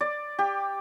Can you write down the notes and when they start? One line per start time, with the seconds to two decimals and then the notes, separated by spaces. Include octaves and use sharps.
0.01 D5
0.39 G4